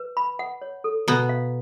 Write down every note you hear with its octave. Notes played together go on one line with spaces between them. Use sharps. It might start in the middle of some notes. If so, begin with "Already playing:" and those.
Already playing: B4
B5
F#5
C#5
A4
B2 B3 A#5
F5